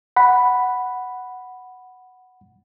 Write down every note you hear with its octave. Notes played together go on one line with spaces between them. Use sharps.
F#5 B5